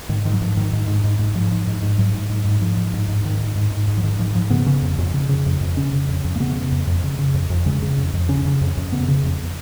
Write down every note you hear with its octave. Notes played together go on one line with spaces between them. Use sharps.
G#2 D#3
G#2 D#3
F#3
G#2 F3
G#2 D#3
G#2
G#2
G#2
G#2
G#2 F3
G#2
G#2
G#2
G#2 F#3
G#2
G#2
G#2
G#2 F3
G#2
G#2
G#2
G#2 D#3
G#2
G#2
G#2
G#2
F3
G#2 D#3
G#2 F3
G#2 F3
C#3 B3
C#3
F2
F2
C#3
C#3
F2
F2
C#3 C#4
C#3
F2
F2
A#3
C#3 B3
C#3
F2
F2
C#3
C#3
F2
F2
C#3 G#3
C#3
F2
F2
C#3 C#4
C#3
F2
F2
C#3 B3
C#3
F2